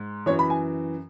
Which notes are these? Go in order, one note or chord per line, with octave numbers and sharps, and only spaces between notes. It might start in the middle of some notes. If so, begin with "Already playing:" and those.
Already playing: G#2
F#2 E3 C#5
B5
G#5